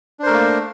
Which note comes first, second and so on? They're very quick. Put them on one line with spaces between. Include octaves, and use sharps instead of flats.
D4 C5 A#4 A3 A#3